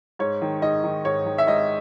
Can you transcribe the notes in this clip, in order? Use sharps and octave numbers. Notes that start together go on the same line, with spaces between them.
G#2 C#5
D#3
G#2 D#5
D#3
G#2 C#5
D#3
E5
G#2 D#5